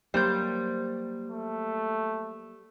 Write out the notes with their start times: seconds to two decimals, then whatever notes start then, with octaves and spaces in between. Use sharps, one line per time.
0.14 F#3 G3 A#3 C5 G6
1.30 A3